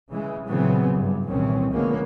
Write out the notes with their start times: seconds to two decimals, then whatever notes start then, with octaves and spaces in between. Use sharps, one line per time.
0.10 C#3 E3 G#3
0.48 A#2 C#3 E3 F#3 B3 C4
0.94 G2
1.28 C2 A#2 D#3 E3 C4 C#4
1.73 D3 F3 G#3 A#3 B3 C#4